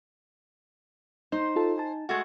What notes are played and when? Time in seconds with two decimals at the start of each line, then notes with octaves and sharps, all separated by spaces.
1.32 D#4 C5 G6
1.56 F4 A4 A5
1.78 G#5 A5
2.09 G#3 A3 F#4